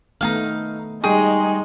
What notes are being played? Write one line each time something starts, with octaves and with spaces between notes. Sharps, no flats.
D#3 A3 B3 D#4 F4 F5
G3 G#3 D#4 G#4 G5 C#6